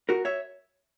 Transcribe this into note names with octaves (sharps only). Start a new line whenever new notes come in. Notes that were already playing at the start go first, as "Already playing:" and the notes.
F#4 A#4
C#5 E5